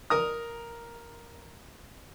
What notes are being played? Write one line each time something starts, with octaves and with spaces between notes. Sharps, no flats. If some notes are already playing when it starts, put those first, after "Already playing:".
A#4 A#5 D#6